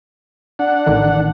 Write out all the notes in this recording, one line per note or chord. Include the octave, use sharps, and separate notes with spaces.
D4 F#5
A1 D3 D#3